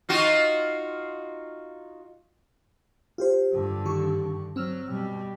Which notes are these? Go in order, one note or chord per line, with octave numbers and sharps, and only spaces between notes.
D#4 F4 F#4
F4 G4 C5
G2 D3
D#3 G4 C#6
F#3 C4 E6 F6
B2 G3